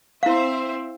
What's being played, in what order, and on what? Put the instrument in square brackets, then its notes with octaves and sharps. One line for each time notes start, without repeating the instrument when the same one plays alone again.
[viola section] C4 C5 E5 [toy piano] E4 F5